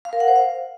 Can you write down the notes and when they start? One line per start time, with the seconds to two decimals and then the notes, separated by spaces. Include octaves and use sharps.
0.05 F5
0.13 A#4
0.20 F#5
0.28 C5
0.36 F5